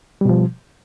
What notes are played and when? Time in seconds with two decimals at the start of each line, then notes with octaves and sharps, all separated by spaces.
0.21 G3
0.25 B2
0.29 F3